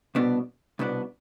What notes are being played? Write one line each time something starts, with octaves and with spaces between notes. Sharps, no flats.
C2 B2 B3 D4
C2 B2 B3 D4